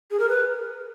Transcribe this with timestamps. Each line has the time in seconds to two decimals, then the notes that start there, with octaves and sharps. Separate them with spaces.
0.11 G#4
0.20 A#4
0.29 B4